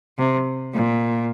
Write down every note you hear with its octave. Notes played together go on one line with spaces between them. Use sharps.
C3
A#2